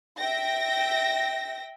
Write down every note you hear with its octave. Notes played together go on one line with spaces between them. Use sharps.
E5 G5 A#6